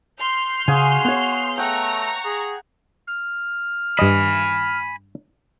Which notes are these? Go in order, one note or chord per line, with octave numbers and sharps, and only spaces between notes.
C6 F6 G6
C#3 F#4 G#4 F5 G#5
B3 C#5
A3 F#5 G5 A#5 C#6
G#4
F6
G2 D#5 G#5 B5